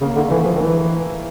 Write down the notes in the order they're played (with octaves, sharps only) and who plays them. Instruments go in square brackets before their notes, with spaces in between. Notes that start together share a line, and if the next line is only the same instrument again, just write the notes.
[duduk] C#3 [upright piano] A#3
[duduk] D3 [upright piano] A3
[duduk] E3 [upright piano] A3
[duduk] F3 [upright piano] G#3
[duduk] D#3
[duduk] E3 [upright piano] A3